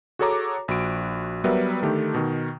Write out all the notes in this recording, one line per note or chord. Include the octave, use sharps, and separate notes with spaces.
F#4 G#4 A4 C#5 A#5 D6
A#1 F#4 D7
F#3 G3 B3 A#4 B4 E5
D3 D#3 A3 D4 G4
B2 D#3